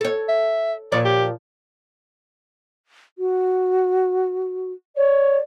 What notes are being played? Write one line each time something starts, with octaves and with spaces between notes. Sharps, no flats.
A4 C#5
E5
A#2 F3 C#5 D5
G4
F#4
C#5 D5